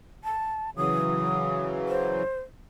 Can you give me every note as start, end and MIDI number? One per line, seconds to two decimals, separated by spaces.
0.24 0.70 81
0.77 2.23 49
0.77 2.23 52
0.77 2.23 54
0.77 1.64 87
1.88 2.40 72